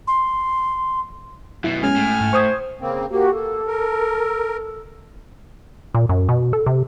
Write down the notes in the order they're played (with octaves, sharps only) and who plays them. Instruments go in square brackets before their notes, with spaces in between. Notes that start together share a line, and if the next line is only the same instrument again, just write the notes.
[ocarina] C6
[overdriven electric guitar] F#2 B2 [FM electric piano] E4
[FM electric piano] G#3 C#4 [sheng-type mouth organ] G#5 F6
[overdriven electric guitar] A2
[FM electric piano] G#2
[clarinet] C5 [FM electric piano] C#6 D#6 G#6
[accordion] C#3 A#3 C4
[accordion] A#3 [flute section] F#4 G4 A#4
[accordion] A#3 [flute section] A4
[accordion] A#4
[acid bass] A#2
F#2
B2
A4
C3